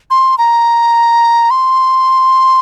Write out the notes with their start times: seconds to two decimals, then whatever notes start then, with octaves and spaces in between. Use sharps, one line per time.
0.10 C6
0.38 A#5
1.51 C6